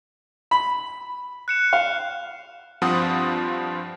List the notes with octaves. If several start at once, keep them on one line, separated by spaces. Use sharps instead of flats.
B5
F#6 C#7 E7
F5 F6
G2 F3 C4 F4 F#5 D#6